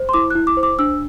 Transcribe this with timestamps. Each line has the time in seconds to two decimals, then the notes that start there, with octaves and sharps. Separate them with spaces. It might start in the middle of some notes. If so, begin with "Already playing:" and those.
Already playing: C5
0.09 C6
0.14 E4 D6
0.30 F#6
0.35 E4
0.47 D6
0.57 C5
0.63 D6
0.79 D4 E6